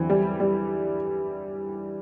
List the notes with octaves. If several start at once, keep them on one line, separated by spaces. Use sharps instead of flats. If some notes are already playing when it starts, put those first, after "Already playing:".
Already playing: E2 D3 E3 F#3 C4
G3
G3